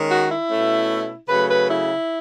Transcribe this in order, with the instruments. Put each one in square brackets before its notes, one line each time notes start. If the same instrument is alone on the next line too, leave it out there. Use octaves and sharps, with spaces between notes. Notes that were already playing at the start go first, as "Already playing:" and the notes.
Already playing: [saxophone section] D#3 G#3 C#4
F#4
E4
B2 A3 C#4
C#3 F#3 A3 B4
B4
E4